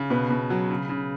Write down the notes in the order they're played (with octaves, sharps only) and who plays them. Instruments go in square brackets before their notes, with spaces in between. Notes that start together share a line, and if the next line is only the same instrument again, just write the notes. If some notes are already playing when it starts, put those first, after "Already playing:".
Already playing: [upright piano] C#3
B2 B4
B2
F#3
C#3
C#3